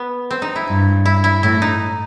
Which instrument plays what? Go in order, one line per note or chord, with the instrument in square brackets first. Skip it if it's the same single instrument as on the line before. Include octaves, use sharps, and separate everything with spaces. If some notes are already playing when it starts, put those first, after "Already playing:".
Already playing: [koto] B3
C4
D#4
E4
[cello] G2
[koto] E4
E4
[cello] A2 [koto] E4
[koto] D#4